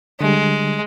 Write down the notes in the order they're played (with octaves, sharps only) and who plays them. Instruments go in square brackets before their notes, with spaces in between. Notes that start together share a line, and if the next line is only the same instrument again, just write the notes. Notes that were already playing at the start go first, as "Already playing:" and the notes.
[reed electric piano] D3 G3 [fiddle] G#3